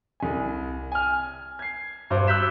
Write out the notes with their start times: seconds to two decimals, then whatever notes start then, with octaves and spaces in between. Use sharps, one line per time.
0.20 C2 G#5
0.92 G#5 F6
1.59 G#6 C7
2.11 G2 F#4 C5 D6
2.27 D6 E6 F#6 G6 B6 E7